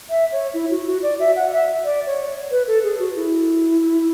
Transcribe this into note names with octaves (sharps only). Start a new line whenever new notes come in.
E5
C#5
E4
F#4
F#4
D5
E5
F#5
E5
D5
C#5
B4
A4
G#4
F#4
E4